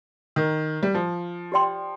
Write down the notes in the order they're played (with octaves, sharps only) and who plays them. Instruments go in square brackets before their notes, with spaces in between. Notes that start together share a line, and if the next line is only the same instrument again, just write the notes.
[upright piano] D#3
G3
F3
[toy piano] G4 D5 G5 C6